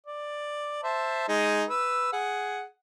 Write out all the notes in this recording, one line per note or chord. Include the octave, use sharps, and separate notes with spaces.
D5
C5 E5 A5
G#3 D#4 G#4
B4 E6
G#4 F#5